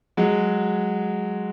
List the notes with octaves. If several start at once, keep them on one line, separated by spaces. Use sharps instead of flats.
F#3 G#3